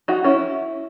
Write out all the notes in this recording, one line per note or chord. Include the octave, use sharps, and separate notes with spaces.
D#4 F#4
C#4 E4